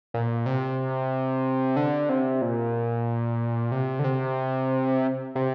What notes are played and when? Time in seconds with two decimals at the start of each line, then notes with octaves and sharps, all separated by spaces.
0.14 A#2
0.46 C3
1.76 D3
2.09 C3
2.42 A#2
3.72 C3
3.99 D3
4.04 C3
5.35 C3